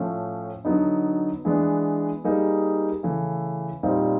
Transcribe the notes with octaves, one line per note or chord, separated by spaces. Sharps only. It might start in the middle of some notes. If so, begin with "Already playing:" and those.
Already playing: A2 F3 A3 C#4
D3 F#3 B3 D#4
E3 G#3 B3 D4
G3 A#3 D#4 G#4
C#3 E3 A3
A#2 G3 C4 D#4